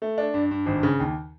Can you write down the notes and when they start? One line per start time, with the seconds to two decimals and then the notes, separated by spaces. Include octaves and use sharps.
0.02 A3
0.18 D4
0.34 G2
0.51 G2
0.66 G#1
0.83 C#3
1.00 D#2